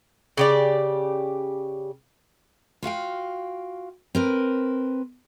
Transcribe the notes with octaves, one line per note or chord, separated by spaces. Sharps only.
C#3 G4 D5
F4 F#4 F5 G5
C4 A#4 B4